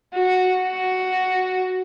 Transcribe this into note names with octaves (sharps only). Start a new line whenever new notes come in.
F#4
F#4